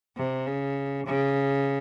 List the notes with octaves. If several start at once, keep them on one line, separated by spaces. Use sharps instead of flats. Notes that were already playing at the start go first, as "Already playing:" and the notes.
C3
C#3
C#3